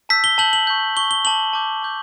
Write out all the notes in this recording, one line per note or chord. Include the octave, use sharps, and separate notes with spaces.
A5 E6 G6 B6
G7
A5 E6 G6 F#7
F#7
C#6 G6
C#6 G6 G7
G7
A5 D6 G6 F#7
A5 D6 G6
A5 D6 G6